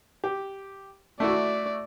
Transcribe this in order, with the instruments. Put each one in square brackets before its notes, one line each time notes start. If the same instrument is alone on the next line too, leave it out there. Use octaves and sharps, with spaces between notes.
[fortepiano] G4
[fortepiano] A3 E4 F#4 [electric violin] D5